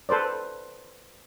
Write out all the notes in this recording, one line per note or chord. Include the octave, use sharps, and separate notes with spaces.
A4 B4 C5 D5